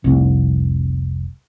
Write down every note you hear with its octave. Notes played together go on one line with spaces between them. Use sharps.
F1 C2